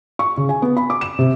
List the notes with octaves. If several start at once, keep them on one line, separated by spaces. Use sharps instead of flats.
C#6
C#3
G#5
B3
B5
D6
E7
C3